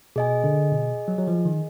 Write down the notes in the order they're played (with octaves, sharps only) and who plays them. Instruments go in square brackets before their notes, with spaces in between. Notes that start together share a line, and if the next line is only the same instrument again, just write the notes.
[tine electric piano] B2 [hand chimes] G#4 D#5 G#5
[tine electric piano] D3
B2
F#3
F#3
F3
D#3